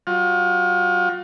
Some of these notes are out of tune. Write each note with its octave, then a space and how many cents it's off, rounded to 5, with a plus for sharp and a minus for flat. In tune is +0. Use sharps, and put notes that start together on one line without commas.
F#3 +45 F4 +35